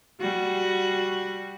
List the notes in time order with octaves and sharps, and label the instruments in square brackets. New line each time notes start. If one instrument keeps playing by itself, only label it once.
[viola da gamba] G3 F#4